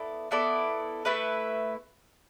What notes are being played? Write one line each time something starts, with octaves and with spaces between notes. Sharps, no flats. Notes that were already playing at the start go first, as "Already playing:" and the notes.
Already playing: B3 E4 A4 D5
B3 E4 A4 D5
A3 E4 B4 E5